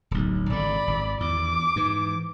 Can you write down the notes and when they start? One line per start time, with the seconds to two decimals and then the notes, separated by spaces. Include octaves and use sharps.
0.11 D1 B1
0.49 G#1 D3 D5 B5
0.87 G#1
1.20 E2 D6
1.76 G#2 E3